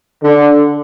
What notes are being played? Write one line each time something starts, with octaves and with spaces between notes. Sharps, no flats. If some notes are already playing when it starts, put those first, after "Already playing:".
D3